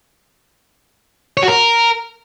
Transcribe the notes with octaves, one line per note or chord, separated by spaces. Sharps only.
C#5
F#4
A#4